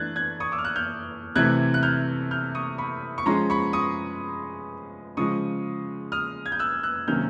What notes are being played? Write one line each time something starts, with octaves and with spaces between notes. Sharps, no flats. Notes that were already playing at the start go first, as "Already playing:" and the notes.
Already playing: E3 A3 D4 F#6 G#6 A6
F#6 G#6
C#6 D#6
D6 E6
F6
E6 F#6
F6 G6
C3 E3 A3 F#6 G#6
F#6
F6 G6
F6 G6
C#6 D#6
B5 C#6
C#6
F3 G#3 C#4 A#5 C6
B5 C#6
C#6 D#6
C#3 F3 G#3 C#6 D#6
D#6 F6
G#6
G6
E6 F#6
E6 F#6
C3 D#3 F#3 A#3 C#4 F6 G6